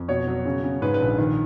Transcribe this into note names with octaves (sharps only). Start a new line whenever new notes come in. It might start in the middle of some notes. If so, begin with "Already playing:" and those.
Already playing: F2
B2 C#5
F#3
C#3
C#3
G#2 B4
B4
A#1
D#3